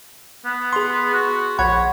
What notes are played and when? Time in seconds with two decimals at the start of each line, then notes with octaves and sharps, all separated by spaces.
0.45 B3
0.73 G#4 C6
1.14 F#4
1.59 A#1 C#5 F#5 B5